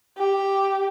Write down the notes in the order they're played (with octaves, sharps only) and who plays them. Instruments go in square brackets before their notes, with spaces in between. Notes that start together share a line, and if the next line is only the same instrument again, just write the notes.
[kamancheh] G4